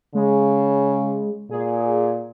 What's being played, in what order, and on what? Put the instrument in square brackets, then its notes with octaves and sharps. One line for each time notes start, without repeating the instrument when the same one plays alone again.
[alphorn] C#3 [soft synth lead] G#3
[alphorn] A#2 [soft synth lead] G#4